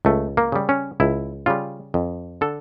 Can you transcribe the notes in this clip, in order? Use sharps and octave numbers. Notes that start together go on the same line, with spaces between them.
C#2 A3
A#3
C#3 G3
C#4
C#2 E4
C#3 G3 F4
F2
D3 A4